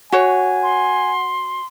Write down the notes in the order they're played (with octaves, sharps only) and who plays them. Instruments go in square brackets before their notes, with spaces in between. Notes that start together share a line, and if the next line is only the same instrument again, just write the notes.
[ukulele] F#4 C#5 [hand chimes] F#5 [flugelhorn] G#5
[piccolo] C6